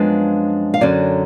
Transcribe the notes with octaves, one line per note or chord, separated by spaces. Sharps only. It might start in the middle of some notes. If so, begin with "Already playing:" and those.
Already playing: F#2 F3 G#3 B3 D4 F5
F5
F#2 D3 F#3 C#4 D5